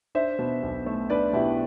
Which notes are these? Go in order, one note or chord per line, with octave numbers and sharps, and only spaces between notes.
D4 C5 E5
B2
B1
A3
D4 B4 D5
B2 E4 G4